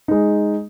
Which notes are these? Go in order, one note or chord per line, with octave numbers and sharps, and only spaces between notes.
G#3 D#4